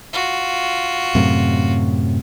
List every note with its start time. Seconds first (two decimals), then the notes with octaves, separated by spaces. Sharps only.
0.13 F4 F#4
1.15 F#2 A2 C3